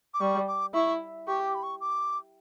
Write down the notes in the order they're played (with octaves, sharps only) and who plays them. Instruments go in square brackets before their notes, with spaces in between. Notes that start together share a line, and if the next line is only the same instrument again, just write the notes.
[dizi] D6
[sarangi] G3 [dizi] C#6
[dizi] D6
[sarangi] E4 [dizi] C#6
[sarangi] G4 [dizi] C#6
[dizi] D6
B5
C#6
D6